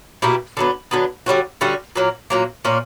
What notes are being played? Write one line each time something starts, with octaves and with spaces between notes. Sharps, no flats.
B2 A#3 E4 G4
D3 F#3 B3
D3 F#3 B3
D3 G3 C#4 F#4
D3 G3 C#4 F#4
A#2 F#3 A#3
A#2 F#3 A#3
A#2 A#3 C#4